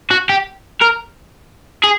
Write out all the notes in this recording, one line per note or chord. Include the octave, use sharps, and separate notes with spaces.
F#4
G4
A#4
G#4